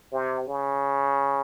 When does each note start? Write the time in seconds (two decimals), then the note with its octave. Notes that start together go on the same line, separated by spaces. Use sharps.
0.13 C3
0.47 C#3